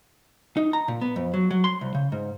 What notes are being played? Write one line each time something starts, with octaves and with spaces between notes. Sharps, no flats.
D#4
A#5
A#2
B3
F2
F#3
F#3
C6
C2
C#3
G#2